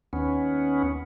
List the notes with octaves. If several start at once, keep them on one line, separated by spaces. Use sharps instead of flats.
D#2 B3 C#4